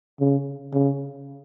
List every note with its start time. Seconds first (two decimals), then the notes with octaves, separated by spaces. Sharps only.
0.20 C#3
0.73 C#3